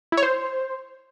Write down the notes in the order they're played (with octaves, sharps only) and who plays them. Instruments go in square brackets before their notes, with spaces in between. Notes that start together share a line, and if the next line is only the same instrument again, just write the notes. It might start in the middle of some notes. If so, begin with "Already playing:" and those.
[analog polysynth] E4
C#5
C5